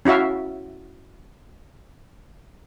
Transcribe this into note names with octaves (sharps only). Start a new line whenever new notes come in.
C#4 E4 F#4 E5 F5